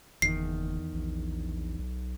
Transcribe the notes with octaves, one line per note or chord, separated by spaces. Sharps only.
F#1 E2 D#3 C7
A#1
B1